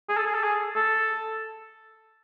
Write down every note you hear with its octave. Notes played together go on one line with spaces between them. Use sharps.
G#4
A4
G#4
A4
G#4
A4